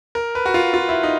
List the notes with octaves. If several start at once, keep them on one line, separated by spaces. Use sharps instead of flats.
A#4
B4
F#4
F4
F4
E4
D#4